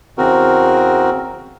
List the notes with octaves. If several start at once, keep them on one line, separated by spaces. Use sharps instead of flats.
E2 C#3 C4 F#4 A#4